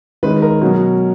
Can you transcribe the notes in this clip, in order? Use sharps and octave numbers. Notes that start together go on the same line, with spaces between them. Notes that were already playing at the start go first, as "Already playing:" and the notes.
D#3 G#3 C#4 B4
A#4
B2 F#3 C#4